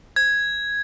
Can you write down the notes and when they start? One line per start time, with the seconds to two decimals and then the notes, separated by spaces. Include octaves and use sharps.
0.16 G#6